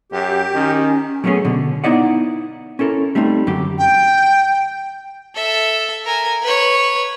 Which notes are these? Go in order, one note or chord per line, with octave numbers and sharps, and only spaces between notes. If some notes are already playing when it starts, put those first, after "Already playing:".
F#2 G4
D#3 C#4
F#3 G3 A3 B3 C#4 G#4
B2 D3
B3 D#4 E4 D5 D#5 F#5
C#4 E4 A4 A#4
G3 A3 C4 D#4
F#2 D3 G4
G5
A4 E5
A#4 G#5
B4 C#5